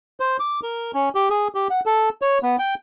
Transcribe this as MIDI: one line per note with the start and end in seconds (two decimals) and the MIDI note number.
0.20 0.37 72
0.40 0.60 86
0.63 0.92 70
0.94 1.09 61
1.15 1.29 67
1.30 1.48 68
1.55 1.68 67
1.70 1.80 78
1.86 2.09 69
2.22 2.39 73
2.43 2.56 59
2.59 2.75 79